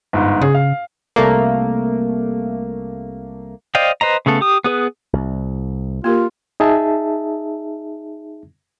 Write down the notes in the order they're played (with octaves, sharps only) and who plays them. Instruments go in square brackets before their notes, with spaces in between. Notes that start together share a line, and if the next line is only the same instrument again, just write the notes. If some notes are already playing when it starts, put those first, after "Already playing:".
[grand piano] G1 G#2
[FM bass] C#3 [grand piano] G#4
[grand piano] F5
[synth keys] C2 A3 A#3
[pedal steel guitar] C5 D5 D#5 F5 G5
B4 C5 D#5 A#5
C#3 A3 B3 A4
G4 D#6
B3 G#4 B4
[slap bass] C2
[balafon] A#3 G4 A#4 [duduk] F4
[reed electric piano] D#4 G#4 E5 A5